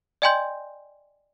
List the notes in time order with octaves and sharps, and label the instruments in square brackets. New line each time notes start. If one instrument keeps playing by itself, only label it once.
[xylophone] D5 D#5 G5 G#5 C6 G6